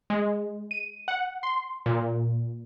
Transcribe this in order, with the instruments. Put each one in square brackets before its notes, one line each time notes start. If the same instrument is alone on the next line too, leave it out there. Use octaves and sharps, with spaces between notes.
[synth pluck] G#3
D#7
F#5
C6
A#2